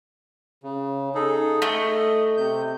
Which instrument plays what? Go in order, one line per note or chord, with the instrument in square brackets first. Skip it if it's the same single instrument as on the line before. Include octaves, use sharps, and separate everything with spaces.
[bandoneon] C#3
D#4 G#4 A4
[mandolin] A3 [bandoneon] D#5
[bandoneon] C3 G6